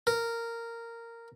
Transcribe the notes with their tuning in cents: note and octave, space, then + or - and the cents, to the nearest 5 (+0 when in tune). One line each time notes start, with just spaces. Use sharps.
A#4 -10